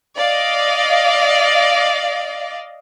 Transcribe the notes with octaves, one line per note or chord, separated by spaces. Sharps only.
D5 D#5 F5